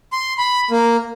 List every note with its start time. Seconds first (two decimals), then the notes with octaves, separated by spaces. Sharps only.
0.12 C6
0.38 B5
0.71 A#3